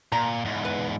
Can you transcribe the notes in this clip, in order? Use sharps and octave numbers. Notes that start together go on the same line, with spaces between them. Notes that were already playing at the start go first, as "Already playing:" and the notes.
A#2 A#5
E2 G#2
B4